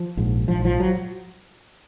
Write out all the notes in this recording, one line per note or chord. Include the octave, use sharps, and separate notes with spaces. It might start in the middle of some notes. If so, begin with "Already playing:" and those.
Already playing: F3
A#1 G#2
A#1 G#2 F3
F3
F#3